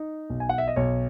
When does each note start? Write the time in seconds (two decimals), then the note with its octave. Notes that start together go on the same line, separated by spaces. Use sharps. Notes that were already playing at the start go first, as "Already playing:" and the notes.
Already playing: D#4
0.30 B1
0.40 G#5
0.49 F#5
0.58 E5
0.68 D#5
0.76 B1 C#5